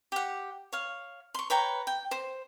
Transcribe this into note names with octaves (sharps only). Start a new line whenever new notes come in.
G4 F#5
C#5 F5
C6 C#6
B4 C#5 G5 A#5
G5
C5